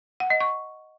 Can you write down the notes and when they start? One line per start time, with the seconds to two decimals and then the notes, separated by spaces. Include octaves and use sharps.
0.20 F#5
0.30 D#5
0.40 C#6